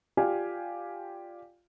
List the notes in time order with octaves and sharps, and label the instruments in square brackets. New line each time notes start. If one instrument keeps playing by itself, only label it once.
[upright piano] F4 G4 D5 F5 G#5